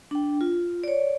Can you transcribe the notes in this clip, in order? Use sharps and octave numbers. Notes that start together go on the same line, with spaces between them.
D4 G5
F4
C#5 D5